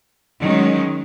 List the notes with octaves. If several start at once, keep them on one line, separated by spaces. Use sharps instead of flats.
D#3 F#3 G#3 C#4